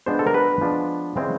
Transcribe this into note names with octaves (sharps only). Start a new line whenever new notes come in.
F3 G#3 B3 D4 C5
A4
A#4
B4
F3 G#3 B3 D4
C#3 E3 G#3 C4